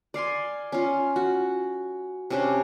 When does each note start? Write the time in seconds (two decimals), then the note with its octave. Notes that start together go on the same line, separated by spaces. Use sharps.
0.14 D5 F5 G#5 C6
0.72 C#4 F4
1.16 F#4
2.30 C3 C#4 D4